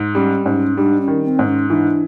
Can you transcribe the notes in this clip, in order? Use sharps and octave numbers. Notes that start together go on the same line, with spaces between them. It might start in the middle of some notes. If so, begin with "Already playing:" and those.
Already playing: G#2
G3 C#4
G#2 C#4
G3 D4
C#4
D#3
C#4
C4
G#2
C#4
E3 D4